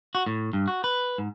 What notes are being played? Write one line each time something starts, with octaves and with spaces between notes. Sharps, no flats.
F#4
A2
G2
F#4
B4
G#2